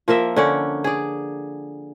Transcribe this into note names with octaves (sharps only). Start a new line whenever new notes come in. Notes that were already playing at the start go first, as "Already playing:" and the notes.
F3 A#3 A#4 E5
D3 C#4 D5
G#4 D5